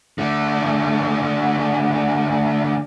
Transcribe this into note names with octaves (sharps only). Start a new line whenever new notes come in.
D3 A3